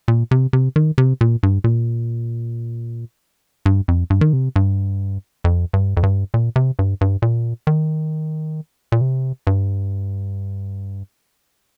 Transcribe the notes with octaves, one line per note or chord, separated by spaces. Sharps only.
A#2
C3
C3
D#3
C3
A#2
G2
A#2
G2
F2
G2
D#3
C3
G2
F2
G2
F2
G2
A#2
C3
G2
G2
A#2
D#3
A#2
C3
G2